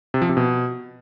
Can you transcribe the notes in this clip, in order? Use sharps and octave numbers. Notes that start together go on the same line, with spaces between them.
C3
F3
C3
B2